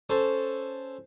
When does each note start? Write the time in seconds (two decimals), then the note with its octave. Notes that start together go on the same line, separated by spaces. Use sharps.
0.10 C#4 A4 C5